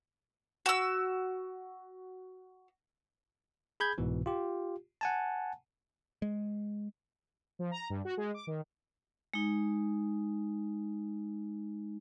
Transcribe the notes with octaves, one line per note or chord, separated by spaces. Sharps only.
F#4 E6
G#4 B5 G6 G#6
C2 G#2 B2 E3
F4 G4
F#5 G#5 A5
G#3
F3
A#5
G2
F#4
G#3
D6
D#3
G#3 D#4